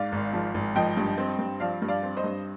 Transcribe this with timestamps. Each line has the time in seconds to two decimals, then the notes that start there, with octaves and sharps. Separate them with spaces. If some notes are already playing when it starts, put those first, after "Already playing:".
Already playing: G#2 D5 F5
0.12 G#1
0.33 F3
0.54 G#1
0.76 F3 D#5 G5
0.97 G2
1.18 C4
1.39 G2
1.60 F3 D5 F5
1.82 G2
1.88 D5 F5
2.03 C4
2.17 C5 D#5
2.24 G2